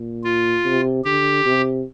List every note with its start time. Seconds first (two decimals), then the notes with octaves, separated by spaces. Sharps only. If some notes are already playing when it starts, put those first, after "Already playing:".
Already playing: A#2
0.24 F4
0.65 C3
1.04 D3 G4
1.45 C3